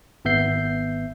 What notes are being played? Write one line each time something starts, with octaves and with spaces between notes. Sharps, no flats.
G#1 B3 E5 G6 C7